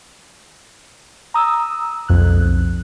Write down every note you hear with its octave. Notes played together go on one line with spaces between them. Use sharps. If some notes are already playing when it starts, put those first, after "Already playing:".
A#5 D#6 E6
B1 F2 F#6